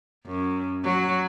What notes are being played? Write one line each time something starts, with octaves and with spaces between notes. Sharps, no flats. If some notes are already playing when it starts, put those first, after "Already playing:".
F#2
F#3